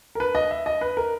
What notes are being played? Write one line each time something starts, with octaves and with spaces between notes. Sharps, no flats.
A#4
B4
D#5
E5
D#5
B4
A#4